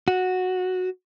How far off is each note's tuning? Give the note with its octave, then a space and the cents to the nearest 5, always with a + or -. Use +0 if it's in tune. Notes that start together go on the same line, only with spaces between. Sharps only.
F#4 -5